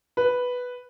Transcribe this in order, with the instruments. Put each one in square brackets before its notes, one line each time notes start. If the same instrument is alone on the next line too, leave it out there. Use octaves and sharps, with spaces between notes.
[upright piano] B4